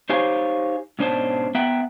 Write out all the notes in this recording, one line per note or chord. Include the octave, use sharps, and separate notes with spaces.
D#4 G4 C5 C#5 F5 G#5
G#2 B2 C#4 D4 C5 A5
B3 E5 F#5 G5 A#5